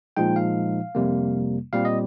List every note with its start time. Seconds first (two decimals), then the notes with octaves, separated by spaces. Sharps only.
0.17 A#2 F3 G#3 D#4 G5
0.36 F5
0.95 F2 C3 G3 A#3
1.73 A#2 G3 C4 F5
1.85 D#5